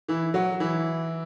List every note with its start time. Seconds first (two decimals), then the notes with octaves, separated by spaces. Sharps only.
0.08 E3 E4
0.34 F#3 F#4
0.60 E3 E4